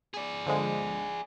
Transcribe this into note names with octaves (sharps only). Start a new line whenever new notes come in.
G#4 D5
D3 F3 G#3